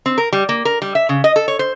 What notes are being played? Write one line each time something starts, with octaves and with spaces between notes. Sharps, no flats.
C4
A#4
G3
A#3
A#4
G3
E5
C#3
D#5
A4
C#5
C5